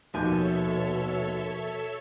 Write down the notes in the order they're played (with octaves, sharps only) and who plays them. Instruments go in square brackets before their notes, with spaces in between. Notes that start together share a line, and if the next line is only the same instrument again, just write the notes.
[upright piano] D#2 G6 [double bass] B2 [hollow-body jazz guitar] F3 G#5 [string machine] A4 C#5 E5